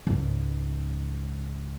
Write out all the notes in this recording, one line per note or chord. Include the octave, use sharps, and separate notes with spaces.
C#2 G#2